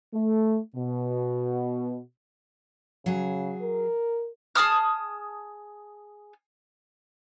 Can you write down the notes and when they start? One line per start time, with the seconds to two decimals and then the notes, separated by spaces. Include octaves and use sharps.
0.14 A3
0.76 B2
3.06 C#3 F#3 G#4
3.62 A#4
4.55 G#4 A5 D#6 F6